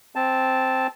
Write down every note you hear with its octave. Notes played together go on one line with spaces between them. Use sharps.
C4 A5